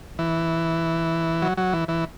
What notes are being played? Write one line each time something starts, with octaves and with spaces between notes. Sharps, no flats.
E3
F#3
F#3
E3
E3